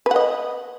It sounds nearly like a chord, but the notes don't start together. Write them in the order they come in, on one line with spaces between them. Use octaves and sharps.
B4 F#5 D#5